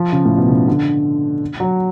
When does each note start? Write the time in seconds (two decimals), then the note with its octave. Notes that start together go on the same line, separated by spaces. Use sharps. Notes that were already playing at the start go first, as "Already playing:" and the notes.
Already playing: F3
0.12 C#3
0.25 A2
0.37 B2
0.49 C#3
0.68 D3
1.60 F#3